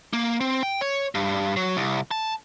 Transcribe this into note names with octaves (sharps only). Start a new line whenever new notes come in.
A#3
C4
G5
C#5
G2
F#3
C2
A5